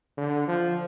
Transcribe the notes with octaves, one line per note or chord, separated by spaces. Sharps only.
D3
F3